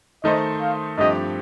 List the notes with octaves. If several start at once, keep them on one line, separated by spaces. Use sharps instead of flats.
D#3 A3 D#4 A4 C5 D#5
F5
G2 F3 A3 C4 G4 D#5